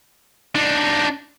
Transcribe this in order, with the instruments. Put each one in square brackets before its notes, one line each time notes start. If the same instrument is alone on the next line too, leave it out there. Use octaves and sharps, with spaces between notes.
[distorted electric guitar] D4 D#4